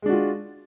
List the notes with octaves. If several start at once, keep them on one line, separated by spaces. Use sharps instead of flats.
G#3 D4 F4 F#4